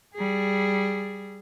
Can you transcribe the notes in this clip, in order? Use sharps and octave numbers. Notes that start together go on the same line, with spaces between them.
G3 G#4